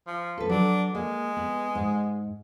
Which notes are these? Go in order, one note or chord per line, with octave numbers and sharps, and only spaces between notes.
F3
A4 B4
F#3 D4
G#3 A#3
B3
G#2